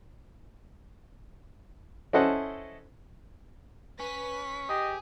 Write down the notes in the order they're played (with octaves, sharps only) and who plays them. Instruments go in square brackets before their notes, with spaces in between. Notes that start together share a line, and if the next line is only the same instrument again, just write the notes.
[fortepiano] C#4 E4 A4 C5 D#5 F#5
[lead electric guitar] C#4 [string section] B4 B6
[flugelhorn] G4 [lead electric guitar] G#4 [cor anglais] D#5